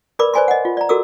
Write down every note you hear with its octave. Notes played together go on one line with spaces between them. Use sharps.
A#4 B4 D5 B5 D6
B4 C5 D5 G#5 B5 C6
D#5 F#5
F4
D5 A#5
F#4 A4 A#4 D6 E6